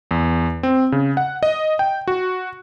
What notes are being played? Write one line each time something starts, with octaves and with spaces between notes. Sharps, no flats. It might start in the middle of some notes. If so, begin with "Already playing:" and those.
E2
C4
C#3
F#5
D#5
G5
F#4